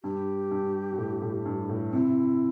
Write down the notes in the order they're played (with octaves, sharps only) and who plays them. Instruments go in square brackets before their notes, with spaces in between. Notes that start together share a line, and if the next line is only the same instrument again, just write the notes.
[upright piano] G2 [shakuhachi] G4
[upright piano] G2
G2
A2
A2
G2
A2
[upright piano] C3 [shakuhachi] E4